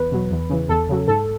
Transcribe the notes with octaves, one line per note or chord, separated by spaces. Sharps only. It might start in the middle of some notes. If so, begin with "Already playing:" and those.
Already playing: E2 B4
B2 F#3
E2
C#3 E3
E2 A4
C#3 F#3
G#2 A4